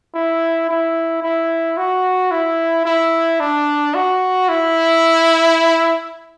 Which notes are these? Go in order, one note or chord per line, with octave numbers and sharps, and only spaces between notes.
E4
E4
E4
F#4
E4
E4
D4
F#4
E4